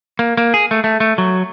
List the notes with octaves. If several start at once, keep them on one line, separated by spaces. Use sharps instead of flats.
A#3
A#3
G#4
A3
A3
A3
F#3